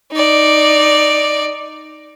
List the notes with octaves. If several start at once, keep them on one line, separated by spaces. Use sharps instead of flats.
D#4 D5